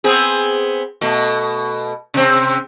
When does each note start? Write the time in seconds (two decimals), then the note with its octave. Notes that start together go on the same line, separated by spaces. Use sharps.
0.04 B3 C4 G#4
1.01 B2 A3
2.14 C3 C4